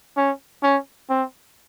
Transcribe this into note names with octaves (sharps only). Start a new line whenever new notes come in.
C#4
C#4
C4